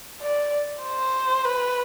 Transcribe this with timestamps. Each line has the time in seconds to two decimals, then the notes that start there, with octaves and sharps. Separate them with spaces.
0.21 D5
0.83 C5
1.45 B4